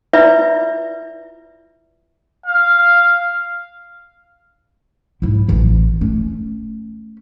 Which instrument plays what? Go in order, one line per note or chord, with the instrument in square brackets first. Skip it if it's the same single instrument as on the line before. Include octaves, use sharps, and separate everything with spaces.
[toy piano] E4 F4 B4 D5 E5
[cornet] F5
[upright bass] G#2 E4
A1 E3
A3 C#4